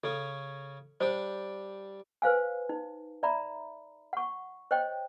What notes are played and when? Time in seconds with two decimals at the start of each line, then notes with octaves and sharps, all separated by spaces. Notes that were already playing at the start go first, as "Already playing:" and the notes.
0.04 C#3 C#4 A4
1.01 G3 D4 G4 C5
2.22 B4 C5 F5 G#5
2.69 D#4
3.23 D5 E5 A#5 B5
4.13 F#5 C#6
4.71 C5 C#5 D#5 G5